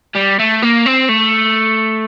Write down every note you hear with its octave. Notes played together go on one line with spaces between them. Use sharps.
G3
A3
A#3
C4
A3